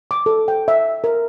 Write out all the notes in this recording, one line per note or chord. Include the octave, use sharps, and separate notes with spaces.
D6
A4
G5
E5
A#4